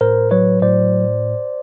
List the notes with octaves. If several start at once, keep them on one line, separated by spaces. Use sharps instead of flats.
A2 A#4 C5
F#3 B4 C#5
A2 C5 D5